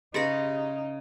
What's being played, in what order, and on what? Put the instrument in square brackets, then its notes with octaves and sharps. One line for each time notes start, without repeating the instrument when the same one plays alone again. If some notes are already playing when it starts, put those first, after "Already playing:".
[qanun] C#3 B4 [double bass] D#4 [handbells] G4 G#4 A#6